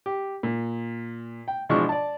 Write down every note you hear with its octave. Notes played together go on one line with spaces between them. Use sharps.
G4
A#2
G5
B2 E3 F3 G#3 D4 C#6
D5 A5